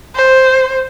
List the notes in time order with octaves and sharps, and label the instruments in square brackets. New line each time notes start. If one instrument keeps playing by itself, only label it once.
[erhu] C5